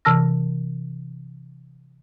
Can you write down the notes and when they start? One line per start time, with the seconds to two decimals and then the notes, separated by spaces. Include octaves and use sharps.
0.05 C3 E3 A5 E6 F6 A#6